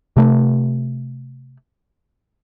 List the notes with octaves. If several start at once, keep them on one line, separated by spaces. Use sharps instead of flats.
C3 A3